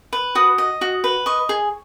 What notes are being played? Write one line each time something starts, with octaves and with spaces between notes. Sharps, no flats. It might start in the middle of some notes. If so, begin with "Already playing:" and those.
B4
F#4 D#6
D#5
F#4
B4
D#5 C#6
G#4